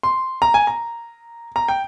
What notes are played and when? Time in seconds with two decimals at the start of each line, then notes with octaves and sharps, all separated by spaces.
0.03 C6
0.42 A#5
0.54 G#5
0.67 A#5
1.56 A#5
1.68 G5